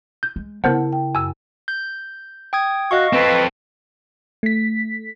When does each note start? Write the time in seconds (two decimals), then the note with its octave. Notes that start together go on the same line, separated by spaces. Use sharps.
0.23 G6
0.36 G#3
0.64 C#3 B3 C4 E4 A#4 C5 F#5 A5
0.93 G5
1.15 F#2 G#5 E6
1.68 G6
2.53 G5 D#6 G#6
2.91 F#4 D#5 F5 C#6
3.13 C4 A4 B4
4.43 A3 B6